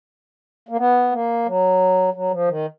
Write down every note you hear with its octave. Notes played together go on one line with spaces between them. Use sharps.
A#3
B3
A#3
F#3
F#3
F3
D#3